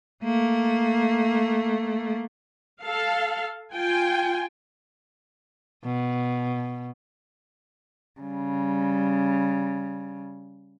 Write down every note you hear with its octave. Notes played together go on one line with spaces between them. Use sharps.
A3 A#3
A4 F5
F4 G5 G#5
B2
C#3 G3